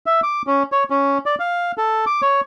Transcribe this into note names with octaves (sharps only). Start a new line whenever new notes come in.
E5
D6
C#4
C#5
C#4
D5
F5
A4
D6
C#5